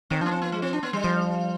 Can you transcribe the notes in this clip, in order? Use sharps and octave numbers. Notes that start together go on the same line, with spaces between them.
D#3 C4
F3 B3 D4
C4
B3
G#3
C4
D4
B3
G3
F3